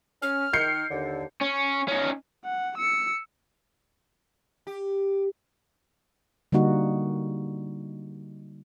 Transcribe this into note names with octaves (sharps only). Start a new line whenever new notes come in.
C#4 F6
D#3 G6 C7 C#7
D#2 D3
C#4
C#4 D#4
F#5
E6 C#7
G4
D3 G3 A#3 D#4 F#4